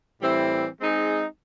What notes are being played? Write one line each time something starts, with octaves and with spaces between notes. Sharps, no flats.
A2 E3 G3 C4 E4
G#3 C4 D#4 G#4